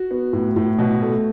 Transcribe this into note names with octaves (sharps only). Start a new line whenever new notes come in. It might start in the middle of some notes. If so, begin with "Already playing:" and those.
Already playing: F#4
B3
A2
A2
B2
A3